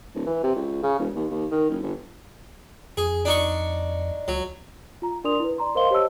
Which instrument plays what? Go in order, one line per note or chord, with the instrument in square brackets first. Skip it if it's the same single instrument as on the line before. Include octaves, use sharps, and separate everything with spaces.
[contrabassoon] D1
E3
C3
C#2
C#3
E1
D#2
D#2
D#3
F#1
G1
[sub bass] F2 [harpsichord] G#4
[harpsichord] D4 D#4 C#6
[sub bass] C#2 [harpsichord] F#3
[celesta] F4 A#5
D4 A#4 D5 C6 D#6 F7
E4 B4
D5 A#5 C6
A#4 C5 D#5 F5 C6 G7
G4 C5 C#5 D#5 A5 E6